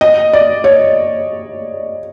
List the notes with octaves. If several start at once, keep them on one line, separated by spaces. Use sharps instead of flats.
D#5
D5
C#5